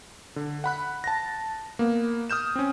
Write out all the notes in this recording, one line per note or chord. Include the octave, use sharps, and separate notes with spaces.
D3
F#5 B5 F#6
A5 A#6
A#3 B3
D#6 F6 G6 E7
C4 C#4